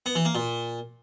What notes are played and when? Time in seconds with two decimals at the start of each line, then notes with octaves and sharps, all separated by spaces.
0.06 B3
0.15 E3
0.25 A#3
0.35 A#2